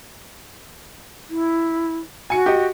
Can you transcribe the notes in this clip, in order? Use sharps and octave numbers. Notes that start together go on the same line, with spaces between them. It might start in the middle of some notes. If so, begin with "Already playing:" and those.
E4
F#4 G#5 C#7
G4 D#5